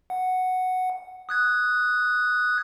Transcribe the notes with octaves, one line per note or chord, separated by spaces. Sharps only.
F#5
D#6 F#6 G#6